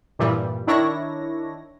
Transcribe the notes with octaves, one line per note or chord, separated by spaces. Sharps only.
G2 A#2 E3 G3
D#3 D4 E4 C#5 A#6